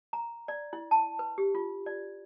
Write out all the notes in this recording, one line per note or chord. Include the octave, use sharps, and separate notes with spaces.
A#5
D5
E4
A5
B4
G4
F4
D5